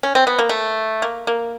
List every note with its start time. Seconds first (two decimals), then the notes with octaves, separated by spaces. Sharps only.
0.03 C#4
0.15 C4
0.27 B3
0.39 A#3
0.49 A3
1.02 A#3
1.27 A#3